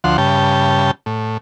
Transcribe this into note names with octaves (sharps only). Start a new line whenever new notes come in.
D2 F3 F#5 C6
G2 C#3 G5 A5
A2